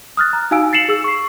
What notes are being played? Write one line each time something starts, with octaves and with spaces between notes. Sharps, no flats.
D#6 F6 F#6 A6
A#5
D#4 F#4 F5 G#5 E6 D7
A6 C7 C#7 E7 F#7
G#4 E6
C#6 C7